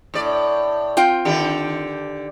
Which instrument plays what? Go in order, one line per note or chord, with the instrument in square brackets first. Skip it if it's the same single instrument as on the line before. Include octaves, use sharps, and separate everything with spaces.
[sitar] A2 D5
[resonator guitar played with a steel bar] C4 F4 G5
[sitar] D3 D#3 G4